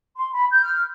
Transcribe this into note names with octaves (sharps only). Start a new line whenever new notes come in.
C6
B5
G6
F6